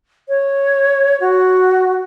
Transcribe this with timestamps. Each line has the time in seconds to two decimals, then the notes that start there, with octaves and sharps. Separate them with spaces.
0.29 C#5
1.20 F#4